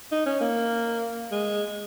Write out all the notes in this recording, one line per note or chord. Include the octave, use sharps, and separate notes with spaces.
D#4
C#4
A#3
G#3